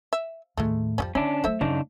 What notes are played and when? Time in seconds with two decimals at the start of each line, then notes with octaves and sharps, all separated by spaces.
0.13 E5
0.57 D#2 A2 G#3 A3
0.98 F2 F3 G3 C#4
1.15 D3 C#4 D4 E4
1.44 F#3 A3 A4 C5 E5
1.61 F#2 C#3 D4 D#4